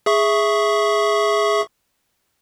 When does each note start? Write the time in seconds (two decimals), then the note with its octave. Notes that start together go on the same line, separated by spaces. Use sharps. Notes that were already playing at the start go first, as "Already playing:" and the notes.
0.06 G#4 E5 C#6